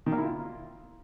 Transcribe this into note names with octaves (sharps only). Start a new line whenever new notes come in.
D#3
A#3
E4
F4